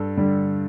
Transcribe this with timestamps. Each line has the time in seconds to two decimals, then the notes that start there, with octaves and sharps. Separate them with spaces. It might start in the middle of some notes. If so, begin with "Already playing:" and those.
Already playing: G2 A4
0.17 D3 G3